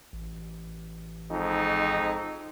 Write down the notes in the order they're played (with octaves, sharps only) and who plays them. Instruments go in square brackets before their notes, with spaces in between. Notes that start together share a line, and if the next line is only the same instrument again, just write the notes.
[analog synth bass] A1
[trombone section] F2 G#2 D#4